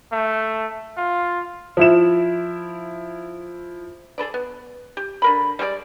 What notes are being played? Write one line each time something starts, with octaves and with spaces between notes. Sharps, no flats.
A3
F4
F3 E4 E7
G#4 A4 B4 D5
B3
G4
D3 A#4 B5
G3 G#3 G4 D5